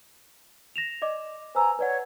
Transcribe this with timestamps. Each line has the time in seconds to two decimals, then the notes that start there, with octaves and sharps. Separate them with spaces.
0.76 A#6 E7 F7
1.02 D5 D#5 D6
1.55 B4 C5 G#5 A#5 E6
1.79 B4 C#5 D5 F#5